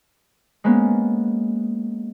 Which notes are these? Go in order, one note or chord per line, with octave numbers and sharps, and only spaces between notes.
G#3 A#3 B3 C#4